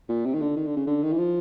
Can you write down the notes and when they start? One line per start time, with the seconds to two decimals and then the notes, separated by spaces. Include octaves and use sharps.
0.09 A#2
0.25 C3
0.34 D#3
0.41 D3
0.56 D#3
0.66 D3
0.76 C#3
0.87 D3
1.03 D#3
1.13 E3
1.18 F3